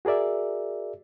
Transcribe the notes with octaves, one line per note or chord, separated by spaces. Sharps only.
F#4 G#4 A#4 D5 E5